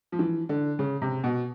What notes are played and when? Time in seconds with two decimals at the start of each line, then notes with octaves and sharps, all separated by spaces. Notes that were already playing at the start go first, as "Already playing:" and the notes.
0.12 F3
0.19 E3
0.49 D3
0.79 C#3
1.02 C3
1.24 B2